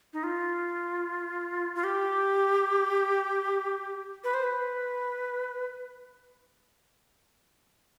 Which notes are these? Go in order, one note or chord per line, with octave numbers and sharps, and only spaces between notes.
D#4
F4
F4
G4
B4
C5
B4